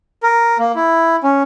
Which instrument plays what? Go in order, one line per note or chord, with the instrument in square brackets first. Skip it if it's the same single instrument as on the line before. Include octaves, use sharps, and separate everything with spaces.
[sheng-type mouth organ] A#4
A#3
E4
C#4